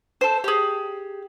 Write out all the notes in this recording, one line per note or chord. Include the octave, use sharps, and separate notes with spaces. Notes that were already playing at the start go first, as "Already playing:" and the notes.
A4 C5
G4 G#4